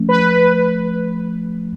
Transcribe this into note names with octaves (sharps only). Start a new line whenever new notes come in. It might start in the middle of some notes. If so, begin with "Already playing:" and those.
Already playing: F3 A3 C#4
B4